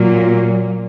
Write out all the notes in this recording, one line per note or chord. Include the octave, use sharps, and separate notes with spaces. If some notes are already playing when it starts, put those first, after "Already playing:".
Already playing: A#2 F#3 A#3